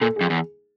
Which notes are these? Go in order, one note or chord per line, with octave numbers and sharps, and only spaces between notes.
A#2 A4
F2 G#4
E2